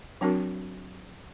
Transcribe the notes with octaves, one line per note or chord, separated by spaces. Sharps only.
F#3 C4 D4 F#4 A#4